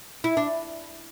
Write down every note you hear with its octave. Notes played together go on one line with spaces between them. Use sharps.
E4
D4